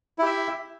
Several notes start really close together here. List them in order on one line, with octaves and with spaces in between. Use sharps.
E4 G4 E5